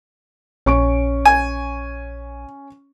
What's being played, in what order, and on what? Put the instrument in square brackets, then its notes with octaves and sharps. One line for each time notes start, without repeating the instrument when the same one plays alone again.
[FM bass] A#1 [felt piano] C#4 C#6 D7
[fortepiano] G#5